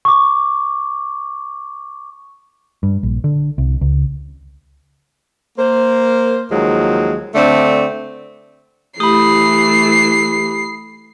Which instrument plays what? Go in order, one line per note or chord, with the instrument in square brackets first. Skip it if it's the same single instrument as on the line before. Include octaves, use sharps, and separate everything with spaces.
[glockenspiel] C#6 D6
[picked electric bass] G2
A#1
D3
C2
C#2
[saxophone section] A#3 C5
D#2 F3 F#3 G#3
D3 A3 C4 D4
[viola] E3 A3 [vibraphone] E4 G4 A#5 [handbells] B5 D#6 [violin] C7